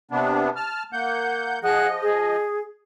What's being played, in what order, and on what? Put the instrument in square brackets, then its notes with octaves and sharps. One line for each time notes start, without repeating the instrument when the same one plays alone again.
[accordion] C3 B3 D4
A5 F6
A#3 F#5 G6
[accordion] F3 D#5 [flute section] G#4 F#5 F#6
[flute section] G#4